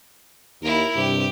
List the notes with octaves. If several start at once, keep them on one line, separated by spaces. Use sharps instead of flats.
D#2 E4 A#4
G2 C3 G4